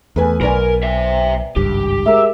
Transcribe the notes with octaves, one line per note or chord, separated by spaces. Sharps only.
E2 A3 B4 G#5
B1 A#4 B4 D5 G#5
C5 E5
G#1 C#2 G2 G4
G#3 A#4 E5